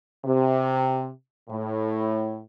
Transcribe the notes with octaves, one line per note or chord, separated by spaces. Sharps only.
C3
A2